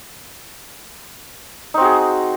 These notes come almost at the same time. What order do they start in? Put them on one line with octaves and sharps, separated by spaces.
D#4 C4 F#4 G#4